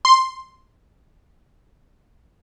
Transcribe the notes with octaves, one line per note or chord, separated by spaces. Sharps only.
C6